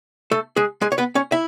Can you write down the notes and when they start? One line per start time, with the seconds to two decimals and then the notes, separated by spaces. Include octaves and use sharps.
0.31 A3 A4
0.56 G#3 G#4
0.82 G#3 G#4
0.92 C#5
0.98 B3 B4
1.15 C#4 C#5
1.32 E4 E5